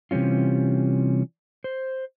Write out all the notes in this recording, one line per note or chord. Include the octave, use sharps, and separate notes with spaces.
C3 E3 G3 C#4 F4
C5